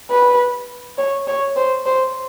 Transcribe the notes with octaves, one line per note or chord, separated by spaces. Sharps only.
B4
C#5
C#5
C5
C5